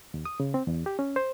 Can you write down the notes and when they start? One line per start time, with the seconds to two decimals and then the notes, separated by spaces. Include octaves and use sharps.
0.14 D#2
0.25 D#6
0.40 C#3
0.54 C4
0.67 E2
0.86 G4
0.99 C#4
1.16 C5